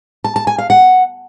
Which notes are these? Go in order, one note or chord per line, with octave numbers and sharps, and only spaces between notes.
A5
A5
G#5
F5
F#5